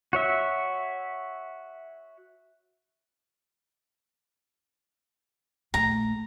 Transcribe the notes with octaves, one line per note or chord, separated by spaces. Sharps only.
F#4 C#5 E5
A#1 A3 A#5